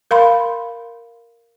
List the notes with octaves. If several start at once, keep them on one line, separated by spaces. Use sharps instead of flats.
A#4 F5 B5 C6